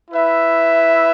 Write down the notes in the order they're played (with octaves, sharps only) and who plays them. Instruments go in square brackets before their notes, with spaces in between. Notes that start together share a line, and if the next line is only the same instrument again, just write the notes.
[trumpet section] E4 B4 E5